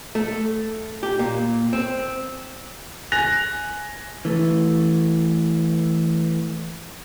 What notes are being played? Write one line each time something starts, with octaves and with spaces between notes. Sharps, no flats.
A3
G4
A#2
C4
G#5 F#6 A#6 F7
E3 A3